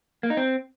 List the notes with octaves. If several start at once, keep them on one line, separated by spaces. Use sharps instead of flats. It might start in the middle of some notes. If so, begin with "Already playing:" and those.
A#3
D#4
C4